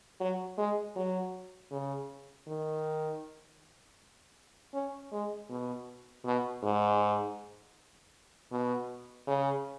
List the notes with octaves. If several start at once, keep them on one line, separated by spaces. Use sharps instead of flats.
F#3
G#3
F#3
C#3
D#3
C#4
G#3
B2
B2
G#2
B2
C#3